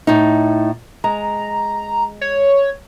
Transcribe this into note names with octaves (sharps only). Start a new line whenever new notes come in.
A2 D#4
G#3 A#5
C#5